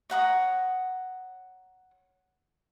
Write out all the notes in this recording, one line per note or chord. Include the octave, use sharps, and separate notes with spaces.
C#5 F#5 A#5 D#6